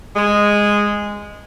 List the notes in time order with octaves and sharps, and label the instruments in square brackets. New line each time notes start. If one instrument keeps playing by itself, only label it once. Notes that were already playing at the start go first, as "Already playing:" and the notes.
[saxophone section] G#3